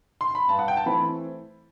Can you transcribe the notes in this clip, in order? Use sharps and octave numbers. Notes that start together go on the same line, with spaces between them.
C6
B5
G2 A5
F#5
G5
A5
E3 A3 C4 B5